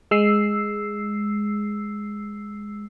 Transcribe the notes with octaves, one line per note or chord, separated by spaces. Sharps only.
G#3 E6 C7